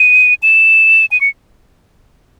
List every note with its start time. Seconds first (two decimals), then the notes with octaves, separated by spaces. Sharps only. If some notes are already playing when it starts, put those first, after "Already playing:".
Already playing: D#7
0.43 E7
1.12 D#7
1.21 C#7